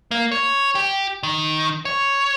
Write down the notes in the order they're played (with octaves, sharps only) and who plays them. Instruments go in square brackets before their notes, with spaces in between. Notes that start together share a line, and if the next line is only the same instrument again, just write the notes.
[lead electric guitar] A#3
C#5
G4
D#3
C#5